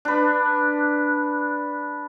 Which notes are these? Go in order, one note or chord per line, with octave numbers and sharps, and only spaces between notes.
D4 B4